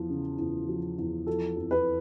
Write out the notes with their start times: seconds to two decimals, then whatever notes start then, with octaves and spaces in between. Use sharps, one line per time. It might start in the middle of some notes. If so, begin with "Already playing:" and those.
Already playing: E2 F3
0.10 C#3
0.39 E2
0.68 F3
0.98 E2
1.27 F3 A4
1.56 F2
1.71 B4